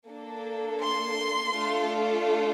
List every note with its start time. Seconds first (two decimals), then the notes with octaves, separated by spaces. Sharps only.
0.09 A#3 D4 A4
0.81 C6
1.54 A3 D4 F4 A4